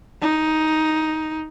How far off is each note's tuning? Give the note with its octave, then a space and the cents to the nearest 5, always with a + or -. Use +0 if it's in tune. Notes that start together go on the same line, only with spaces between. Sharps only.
D#4 +10